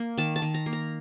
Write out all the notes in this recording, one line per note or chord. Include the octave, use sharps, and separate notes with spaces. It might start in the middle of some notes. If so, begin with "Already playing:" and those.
Already playing: A#3
D#3 A5
A5
D#3
A#5
A#3
A#5